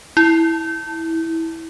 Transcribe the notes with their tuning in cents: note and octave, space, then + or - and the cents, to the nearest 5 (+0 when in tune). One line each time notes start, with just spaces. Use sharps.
E4 -15